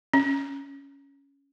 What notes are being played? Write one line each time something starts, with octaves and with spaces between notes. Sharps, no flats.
C#4